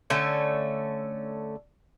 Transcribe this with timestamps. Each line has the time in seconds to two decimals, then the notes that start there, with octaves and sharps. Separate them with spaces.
0.10 D3 A3 C#4